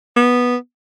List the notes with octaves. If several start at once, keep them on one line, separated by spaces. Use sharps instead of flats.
B3